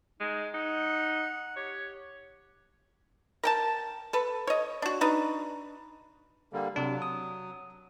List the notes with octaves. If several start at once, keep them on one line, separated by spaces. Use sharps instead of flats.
G#3 D#4
D#4 F#5
G4 C#5
A#4 G5 A5
A4 B4
C#5 D#5
D4 F#4
D4 D#4 B4
D3 G3 A#3
C3 F#3 D4
D#6